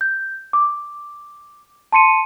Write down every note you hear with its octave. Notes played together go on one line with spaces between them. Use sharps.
G6
D6
A5 C6 C#7 D#7